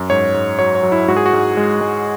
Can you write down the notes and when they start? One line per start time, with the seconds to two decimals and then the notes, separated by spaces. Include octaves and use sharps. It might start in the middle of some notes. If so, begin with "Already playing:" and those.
Already playing: F#2
0.10 G#2 C#5
0.34 G#2
0.59 F#3 C#5
0.75 C#5
0.83 F#3
0.92 E4
1.08 G#2 F#4
1.16 G#4
1.26 F#4
1.33 G#2
1.57 G#3
1.81 G#3